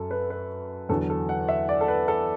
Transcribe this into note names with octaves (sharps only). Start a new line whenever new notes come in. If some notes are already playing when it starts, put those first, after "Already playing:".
Already playing: F#2 F#3 A4
B4
B4
E2 D3 F#3 A4
A4
F#5
E5
D5
A4
B4
A4